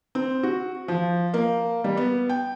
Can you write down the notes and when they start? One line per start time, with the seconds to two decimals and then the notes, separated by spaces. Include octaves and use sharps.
0.15 C4
0.43 F#4
0.88 F3
1.34 A#3
1.84 G3
1.97 B3
2.29 G5